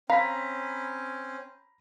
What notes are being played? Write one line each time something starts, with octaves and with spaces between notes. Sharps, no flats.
C4 C#4 F5 A#5 B5 B6